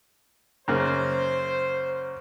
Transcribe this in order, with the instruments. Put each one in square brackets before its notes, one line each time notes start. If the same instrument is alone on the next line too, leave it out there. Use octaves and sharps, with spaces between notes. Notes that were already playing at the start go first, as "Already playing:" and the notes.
[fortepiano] F#2 C#3 A#3 [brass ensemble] C5